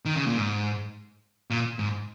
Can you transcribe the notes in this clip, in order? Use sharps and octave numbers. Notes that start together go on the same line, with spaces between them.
D#3
C#3
A#2
G#2
A#2
G#2